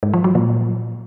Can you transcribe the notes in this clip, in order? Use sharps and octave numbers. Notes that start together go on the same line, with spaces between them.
G#2
F3
F#3
A#2